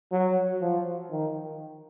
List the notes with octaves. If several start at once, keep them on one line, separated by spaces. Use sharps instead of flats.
F#3
F3
D#3